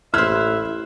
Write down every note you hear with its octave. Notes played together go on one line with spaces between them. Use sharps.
A1 E4 C5 E5 F6 F#6